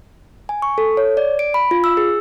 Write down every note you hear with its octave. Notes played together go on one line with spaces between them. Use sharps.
G#5
C#6
A4
C#5
D5
D7
B5
F4
E6
G#4